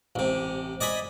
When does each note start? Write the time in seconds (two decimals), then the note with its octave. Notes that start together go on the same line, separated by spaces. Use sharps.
0.15 A1 C3
0.81 D5 D#5 G#5 B5